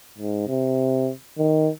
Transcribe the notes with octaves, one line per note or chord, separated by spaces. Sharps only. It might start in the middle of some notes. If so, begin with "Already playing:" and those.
G#2
C3
D#3